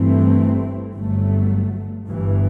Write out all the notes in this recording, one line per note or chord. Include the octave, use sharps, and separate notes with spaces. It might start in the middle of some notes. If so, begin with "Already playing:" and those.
Already playing: G1 G2 E3 A3 C4
G1 G2 F#3 A3
G1 G2 E3